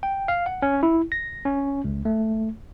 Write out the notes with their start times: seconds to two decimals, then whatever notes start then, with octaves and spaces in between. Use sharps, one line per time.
0.03 G5
0.28 F5
0.46 F#5
0.62 C#4
0.83 E4
1.12 A#6
1.45 C#4
1.84 C#2
2.05 A3